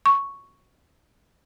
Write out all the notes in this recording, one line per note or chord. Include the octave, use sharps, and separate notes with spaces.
C#6